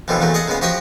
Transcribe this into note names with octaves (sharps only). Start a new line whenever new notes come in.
D#2 B2 D3 E3 F3 G3
E2 A#2 F#3 A3
G#4 D#5 F5 F#5 A5
A#2 C#3 G#3 B3 F5
F3 F#4 G4 D#5 G5 C#6